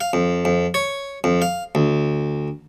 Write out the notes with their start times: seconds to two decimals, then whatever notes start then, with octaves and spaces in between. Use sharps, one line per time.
0.01 F5
0.13 F2
0.45 F2
0.74 C#5
1.24 F2
1.42 F5
1.75 D2